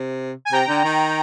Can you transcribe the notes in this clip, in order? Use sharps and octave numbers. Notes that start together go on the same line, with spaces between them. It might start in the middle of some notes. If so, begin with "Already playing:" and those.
Already playing: C3
G#5
C3 G5 A#5
D3
D#3